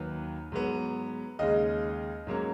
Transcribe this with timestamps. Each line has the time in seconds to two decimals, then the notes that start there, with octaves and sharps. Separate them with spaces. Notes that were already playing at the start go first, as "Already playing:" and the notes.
Already playing: D#2 D#3 F#3 B4
0.52 G#2 F#3 B3
1.39 D#2 C#3 G#3 D#5
2.27 G#2 F#3 A#3 C#4